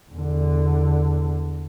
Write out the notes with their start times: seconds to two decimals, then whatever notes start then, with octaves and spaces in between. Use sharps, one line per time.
0.11 E2 D3